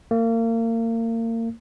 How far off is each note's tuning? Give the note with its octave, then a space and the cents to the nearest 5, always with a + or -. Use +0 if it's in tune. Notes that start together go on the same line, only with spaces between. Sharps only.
A#3 -35